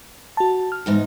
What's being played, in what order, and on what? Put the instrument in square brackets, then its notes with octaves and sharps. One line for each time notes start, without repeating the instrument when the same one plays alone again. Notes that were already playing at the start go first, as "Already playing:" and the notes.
[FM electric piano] F#4 A5
F6
[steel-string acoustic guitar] E2 G#2 D#4